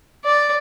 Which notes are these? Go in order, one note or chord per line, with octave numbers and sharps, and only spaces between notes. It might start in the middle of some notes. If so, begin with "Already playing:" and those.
D5